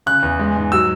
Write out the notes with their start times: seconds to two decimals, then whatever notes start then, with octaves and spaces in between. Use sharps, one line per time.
0.06 C#3 F#6
0.23 E2
0.39 G#3
0.56 G#2
0.72 F#3 E6